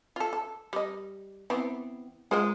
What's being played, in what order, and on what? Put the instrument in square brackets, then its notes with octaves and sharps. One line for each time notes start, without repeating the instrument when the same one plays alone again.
[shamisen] F4 A4
A4
G3 D#5
E3 B3 C4
[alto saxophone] G#3 [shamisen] F4 C5 G5